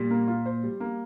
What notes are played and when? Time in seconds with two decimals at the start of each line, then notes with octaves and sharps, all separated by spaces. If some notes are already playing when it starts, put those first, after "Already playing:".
Already playing: A#2 G3
0.11 A#3
0.28 F4
0.46 C5
0.63 G3
0.80 A#3